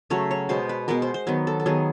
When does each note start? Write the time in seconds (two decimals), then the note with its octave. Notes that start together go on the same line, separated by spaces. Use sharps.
0.10 C#3 F#3 A3 C#5
0.31 C#5
0.49 B2 G#3 B3 C5
0.69 B4
0.88 B2 G#3 B3 A#4
1.02 C5
1.14 C5
1.27 D#3 F#3 B3 B4
1.47 A4
1.60 A4
1.66 D#3 F#3 B3 G#4